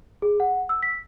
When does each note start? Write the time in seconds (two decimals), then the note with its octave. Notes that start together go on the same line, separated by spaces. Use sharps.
0.22 G#4
0.40 F#5
0.69 E6
0.83 B6